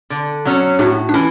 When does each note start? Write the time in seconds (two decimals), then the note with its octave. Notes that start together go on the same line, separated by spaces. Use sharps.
0.10 D3
0.45 F#3 C#4
0.79 A2 D4 F#4
1.09 D4
1.14 E3 C#4 E4